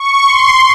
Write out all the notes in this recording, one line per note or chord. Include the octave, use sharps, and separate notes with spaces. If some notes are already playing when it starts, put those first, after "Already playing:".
Already playing: C#6
C6